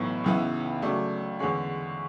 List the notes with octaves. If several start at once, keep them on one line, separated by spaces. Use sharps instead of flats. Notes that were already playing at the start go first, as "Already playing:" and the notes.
Already playing: B1 A2 E3 B3 E4
C#2 C#3 E3 B3 E4
C#2 C#3 F#3 A3 D4
E2 D3 G#3 C#4